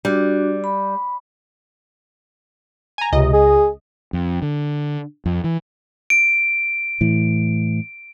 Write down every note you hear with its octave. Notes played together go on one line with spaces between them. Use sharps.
G3 D4 F#4
B5
G#5 A#5
C#2 C3 D#5
G#4
F2
D3
F2
E3
D7
A2 E3